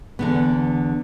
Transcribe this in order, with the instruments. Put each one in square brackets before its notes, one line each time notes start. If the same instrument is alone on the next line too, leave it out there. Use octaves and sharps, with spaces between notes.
[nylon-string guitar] E2 D3 B3